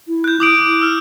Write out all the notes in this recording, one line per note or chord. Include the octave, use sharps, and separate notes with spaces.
E4
F#6 G6
E3 D6 D#6 D7
E4
E6 F6